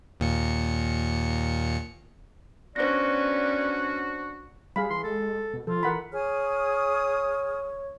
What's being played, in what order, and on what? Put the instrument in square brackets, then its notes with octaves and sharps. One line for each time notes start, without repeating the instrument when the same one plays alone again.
[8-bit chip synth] D#2 A#2 C#7
[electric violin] B3 C#4 [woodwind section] D4 F#4 [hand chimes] C5 A#6 [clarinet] D5
[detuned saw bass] G3 [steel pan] G#4 F5 B5
[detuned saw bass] E3 [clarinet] C6
[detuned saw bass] G#3 [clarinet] A4
[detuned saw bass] B2
[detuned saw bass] F3 [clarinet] F4 [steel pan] A4
[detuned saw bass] E3 [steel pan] A#4 F#5 B5
[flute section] G#4 D#6 F6 [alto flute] C#5